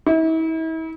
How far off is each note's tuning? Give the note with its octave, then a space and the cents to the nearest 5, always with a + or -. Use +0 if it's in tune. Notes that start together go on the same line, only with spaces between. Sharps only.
E4 -40